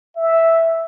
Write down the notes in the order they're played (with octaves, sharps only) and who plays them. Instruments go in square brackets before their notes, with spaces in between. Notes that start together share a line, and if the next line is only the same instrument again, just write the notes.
[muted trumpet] E5